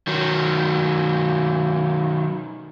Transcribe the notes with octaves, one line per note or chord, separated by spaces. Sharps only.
D#3 F#3